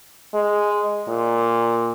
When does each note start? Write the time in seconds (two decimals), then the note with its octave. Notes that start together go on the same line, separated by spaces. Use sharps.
0.34 G#3
1.08 A#2